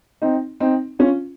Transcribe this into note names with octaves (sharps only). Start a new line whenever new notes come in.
C4 D#4
C4 D#4
C#4 F4